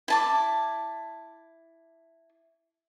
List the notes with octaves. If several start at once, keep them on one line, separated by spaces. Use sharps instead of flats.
E4 A5 D6